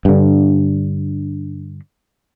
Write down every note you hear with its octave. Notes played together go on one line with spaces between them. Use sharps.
G2 D3